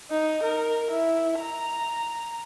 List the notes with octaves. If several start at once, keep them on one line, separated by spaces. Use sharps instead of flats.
D#4
A#4
E4
A#5